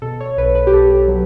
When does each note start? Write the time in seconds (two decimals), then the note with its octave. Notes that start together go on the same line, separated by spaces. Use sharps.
0.02 B2 A4
0.20 C#5
0.37 B1 B4
0.55 B4
0.67 G4
0.73 B1 A4
1.08 F#3